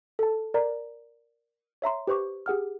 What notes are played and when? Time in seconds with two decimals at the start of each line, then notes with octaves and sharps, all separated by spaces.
0.19 A4 A5
0.54 A#4 D5 A#5
1.82 C#5 E5 A#5 C6
2.07 G4 B4 C5 C#6 D6
2.46 G4 G#4 F#5 F6